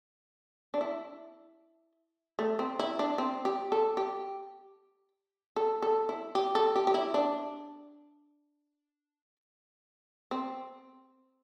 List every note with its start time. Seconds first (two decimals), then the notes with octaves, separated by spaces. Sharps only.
0.74 D4
0.81 E4
2.39 A3
2.59 C4
2.79 E4
2.99 D4
3.18 C4
3.45 G4
3.72 A4
3.97 G4
5.56 A4
5.82 A4
6.09 E4
6.35 G4
6.55 A4
6.76 G4
6.87 G4
6.94 E4
7.14 D4
10.31 C4